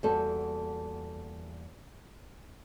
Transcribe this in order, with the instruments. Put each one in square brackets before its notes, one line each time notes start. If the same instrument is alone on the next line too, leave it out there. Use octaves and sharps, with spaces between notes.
[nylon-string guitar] E2 G3 A#3 F#4 A4